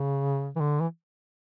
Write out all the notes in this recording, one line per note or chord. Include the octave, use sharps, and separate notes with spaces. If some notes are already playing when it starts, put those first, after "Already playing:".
Already playing: C#3
E3
D3
E3